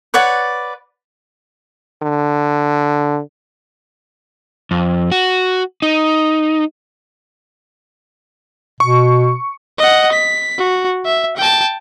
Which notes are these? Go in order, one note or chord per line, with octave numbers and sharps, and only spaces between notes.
B4 C#5 D5 F#5
D3
F2
F#4
D#4
B2 C#6
D#5 F#5
B6
F#4
E5
G5 A5